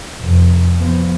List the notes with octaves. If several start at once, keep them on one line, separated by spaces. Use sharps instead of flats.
F1 F2
F3 B3